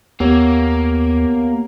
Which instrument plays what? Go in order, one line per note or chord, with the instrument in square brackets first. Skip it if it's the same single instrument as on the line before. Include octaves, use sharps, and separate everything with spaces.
[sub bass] D#2 [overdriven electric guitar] A#3 [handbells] B3 G4 C#5